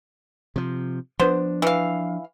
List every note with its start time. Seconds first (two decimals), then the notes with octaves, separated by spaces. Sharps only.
0.56 C3 F3
1.19 F3 B3 D4 C5
1.62 E3 F5